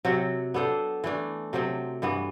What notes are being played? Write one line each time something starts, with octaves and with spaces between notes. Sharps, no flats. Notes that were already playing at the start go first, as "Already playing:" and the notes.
C3 F#3 C4 F#4
B3 D4 A4 C5
E3 A3 D4
C3 F#3 C4
G2 E3 B3